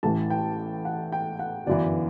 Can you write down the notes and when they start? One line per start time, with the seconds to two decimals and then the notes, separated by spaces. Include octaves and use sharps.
0.03 A1 A2 E3 A5
0.30 G5
0.85 F#5
1.12 G5
1.39 F#5
1.67 G1 F#2 E3 D5